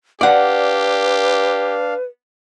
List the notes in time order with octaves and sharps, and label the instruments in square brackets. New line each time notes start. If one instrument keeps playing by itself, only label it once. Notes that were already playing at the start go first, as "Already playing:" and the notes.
[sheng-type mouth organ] D4 F5 [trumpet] G4 [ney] B4 [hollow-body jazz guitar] D5 F#5